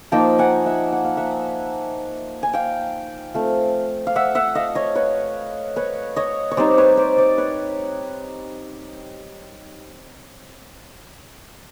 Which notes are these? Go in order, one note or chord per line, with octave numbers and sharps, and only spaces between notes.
F3 A#3 D#4 G5 A5
F#5 G#5
E5 F#5
F#5
F5
E5 F#5
G#5
F5 G5
A3 C4 F4
F5
E5 F#5
E5 F#5
D#5 F5
C#5 D#5
B4 C#5
B4 C#5
C#5 D#5
C#5
G3 C4 D#4 C5 D5
B4 C#5
C5 D5
C5 D5
B4 C#5